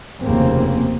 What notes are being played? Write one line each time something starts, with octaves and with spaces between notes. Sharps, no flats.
F1 D#2 C#3 A#3 C4